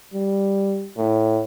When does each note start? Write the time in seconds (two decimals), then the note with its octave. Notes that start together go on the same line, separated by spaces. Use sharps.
0.14 G3
0.97 A2